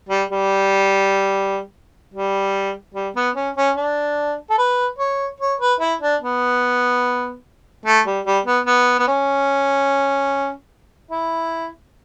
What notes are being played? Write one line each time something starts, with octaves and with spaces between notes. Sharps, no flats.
G3
G3
G3
G3
B3
C#4
C#4
D4
A4
B4
C#5
C#5
B4
E4
D4
B3
A3
G3
G3
B3
B3
B3
C#4
E4